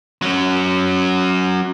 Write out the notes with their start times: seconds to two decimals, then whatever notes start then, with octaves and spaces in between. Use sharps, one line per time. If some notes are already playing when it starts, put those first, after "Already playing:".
0.22 F#3 C#4